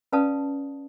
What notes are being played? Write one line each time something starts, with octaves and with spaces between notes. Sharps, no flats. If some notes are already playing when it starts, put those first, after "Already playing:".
C#4 B4 D5 F5 A5 D#6